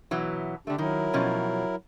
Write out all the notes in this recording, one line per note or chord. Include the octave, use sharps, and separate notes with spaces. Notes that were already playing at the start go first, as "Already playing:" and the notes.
B2 E3 F#3
D3 A3 D4 G4
D#3 F#3 E4 A#4
B2 F3 C#4